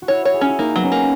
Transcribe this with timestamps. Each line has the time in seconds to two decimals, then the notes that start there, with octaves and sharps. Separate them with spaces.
0.02 F#4
0.08 E4 C#5
0.25 C#5
0.34 G#4
0.41 C#4
0.49 E4
0.59 A#3 D#4
0.76 F#3 B3
0.83 C#4
0.92 A#3